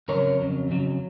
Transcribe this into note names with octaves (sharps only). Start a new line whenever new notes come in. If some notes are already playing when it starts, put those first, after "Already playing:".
F2 C#3 F#3 A#4 C#5
F2 C#3 F#3
F2 C#3 F#3